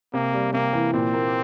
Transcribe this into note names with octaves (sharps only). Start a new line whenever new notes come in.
C3 A#3
G3
C3 A#3
E3
A#2 C4
A#3